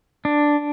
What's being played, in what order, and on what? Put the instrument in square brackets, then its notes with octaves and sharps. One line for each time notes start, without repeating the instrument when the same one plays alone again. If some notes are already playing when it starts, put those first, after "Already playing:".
[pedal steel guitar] D4